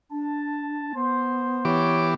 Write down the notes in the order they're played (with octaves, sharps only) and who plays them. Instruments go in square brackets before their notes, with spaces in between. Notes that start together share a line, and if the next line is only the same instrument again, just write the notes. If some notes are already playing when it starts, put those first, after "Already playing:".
[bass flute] D4 [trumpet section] A5
[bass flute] B3 [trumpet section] C5
[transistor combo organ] E3 G4 D6 [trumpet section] C#5